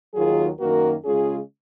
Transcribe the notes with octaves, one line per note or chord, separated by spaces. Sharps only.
D#2 D#3 F#3 F4 G#4
F#2 D#3 A#3 F#4 A#4
C#3 G#3 C#4 F4 G#4